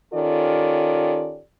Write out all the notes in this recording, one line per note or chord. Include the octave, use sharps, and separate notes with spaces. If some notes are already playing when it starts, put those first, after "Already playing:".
D#3 C#4 F4 G4 A4 D5